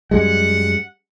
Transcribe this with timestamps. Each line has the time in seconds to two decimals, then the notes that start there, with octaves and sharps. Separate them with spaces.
0.11 F#2 G3 G#3 F#5